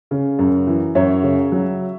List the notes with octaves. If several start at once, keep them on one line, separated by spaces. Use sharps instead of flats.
C#3
F#2
E3
F#2 C#5 E5
C#3
F#3